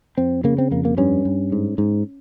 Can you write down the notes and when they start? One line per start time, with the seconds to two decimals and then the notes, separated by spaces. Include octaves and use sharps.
0.18 F2 C4
0.44 C#3 A#3
0.58 C4
0.71 F2 A#3
0.85 A#3
0.97 G2 C#4
1.25 G2
1.52 G#2
1.78 G#2